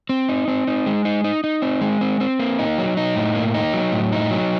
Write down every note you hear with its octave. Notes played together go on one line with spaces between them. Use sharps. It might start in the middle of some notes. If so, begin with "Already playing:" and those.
C4
D#4
C4
D#4
G#3
D#4
D#4
D#4
C4
G#3
C4
C4
A#3
D#4
F#3
D#4
A2
A#3
D#4
F#3
A2
D#4
F#3